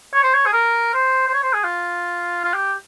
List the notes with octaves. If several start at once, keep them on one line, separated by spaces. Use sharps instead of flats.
C#5
C5
C#5
G#4
A#4
C5
C5
C#5
C5
G#4
F4
F4
G4